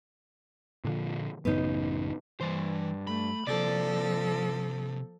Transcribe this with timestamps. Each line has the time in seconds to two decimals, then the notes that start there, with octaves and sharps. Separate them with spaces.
0.85 A#2 D3 F3
1.45 A1 F#2 C#3 B3 D#4
2.41 G2 E3 C5
3.07 A3 B5
3.47 C3 F3 A#3 A4 D5